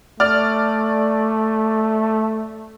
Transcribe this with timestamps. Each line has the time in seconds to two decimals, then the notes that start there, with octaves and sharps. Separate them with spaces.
0.20 A3 D5 F6